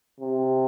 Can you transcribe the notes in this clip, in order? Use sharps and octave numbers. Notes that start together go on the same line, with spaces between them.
C3